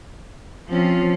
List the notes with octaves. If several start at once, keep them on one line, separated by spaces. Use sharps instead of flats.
F3 C4 C#4 F4